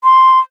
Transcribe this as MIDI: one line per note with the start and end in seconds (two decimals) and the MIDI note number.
0.04 0.39 84